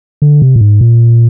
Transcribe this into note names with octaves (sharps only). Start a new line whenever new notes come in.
D3
C3
A#2
G#2
A#2